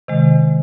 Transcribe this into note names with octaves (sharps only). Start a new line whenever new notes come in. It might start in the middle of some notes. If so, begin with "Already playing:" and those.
C3 D#3 G#3